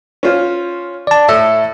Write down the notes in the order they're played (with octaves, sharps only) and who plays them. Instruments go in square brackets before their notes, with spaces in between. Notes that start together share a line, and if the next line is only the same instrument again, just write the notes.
[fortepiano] C#4 F4 C5
[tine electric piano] D5 A5
[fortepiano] A2 A4 [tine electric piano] E5